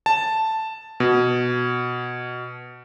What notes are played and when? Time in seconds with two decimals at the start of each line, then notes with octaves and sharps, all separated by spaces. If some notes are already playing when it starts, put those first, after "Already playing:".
0.06 A5
1.00 B2